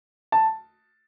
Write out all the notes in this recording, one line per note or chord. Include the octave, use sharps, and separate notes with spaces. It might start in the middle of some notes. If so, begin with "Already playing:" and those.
A5